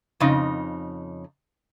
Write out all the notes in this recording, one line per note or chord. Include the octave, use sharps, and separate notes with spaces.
F2 C#3 D#4